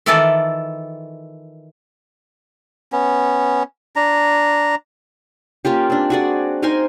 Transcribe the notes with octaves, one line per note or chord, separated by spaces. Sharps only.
D#3 E3 E4 F4 A4 D5
B3 C#4
D4 A#5
A#3 C#4 F4 G4
C4 D4
F#4 G#4 D5
D#4 A#4 C5 G#5